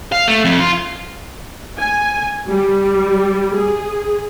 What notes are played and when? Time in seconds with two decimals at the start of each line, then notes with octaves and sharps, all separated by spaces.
0.12 F5
0.28 A3
0.45 F2
0.60 F4
1.78 G#5
2.49 G3
3.56 G#4